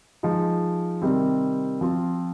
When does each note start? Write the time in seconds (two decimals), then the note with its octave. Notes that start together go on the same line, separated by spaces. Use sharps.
0.23 F3 G#3 D#4
1.02 C3 D#3 G3 C4
1.81 F3 C4 F4